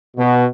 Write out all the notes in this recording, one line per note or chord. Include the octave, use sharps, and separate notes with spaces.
B2